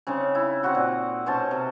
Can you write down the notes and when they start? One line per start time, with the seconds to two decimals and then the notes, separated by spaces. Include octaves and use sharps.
0.07 C#3 C4 C#4 D#4
0.35 E4
0.63 C4 D#4 F#4 F#5
0.75 A#2
1.26 B2 C#4 C5 A5
1.51 C3